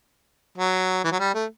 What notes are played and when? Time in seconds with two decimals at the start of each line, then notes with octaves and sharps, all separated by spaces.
0.58 F#3
1.05 E3
1.12 F#3
1.20 G3
1.35 A3